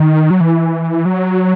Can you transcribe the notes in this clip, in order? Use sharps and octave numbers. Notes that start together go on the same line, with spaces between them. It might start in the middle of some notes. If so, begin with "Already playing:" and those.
Already playing: D#3
F#3
E3
F#3